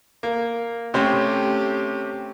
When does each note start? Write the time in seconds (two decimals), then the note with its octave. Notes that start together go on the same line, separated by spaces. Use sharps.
0.23 A#3
0.94 C3 A3 C#4 G4 C5